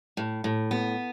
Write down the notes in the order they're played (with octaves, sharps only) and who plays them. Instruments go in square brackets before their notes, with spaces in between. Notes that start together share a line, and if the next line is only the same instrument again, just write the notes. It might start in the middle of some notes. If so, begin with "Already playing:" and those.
[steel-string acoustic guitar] A2
A2
B3